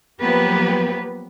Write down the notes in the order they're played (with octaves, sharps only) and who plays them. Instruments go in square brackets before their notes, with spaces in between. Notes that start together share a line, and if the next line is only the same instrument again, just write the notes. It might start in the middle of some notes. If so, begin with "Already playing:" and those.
[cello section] F3 F#3 A#3 B3 G4 B4